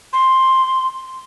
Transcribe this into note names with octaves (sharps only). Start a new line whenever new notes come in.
C6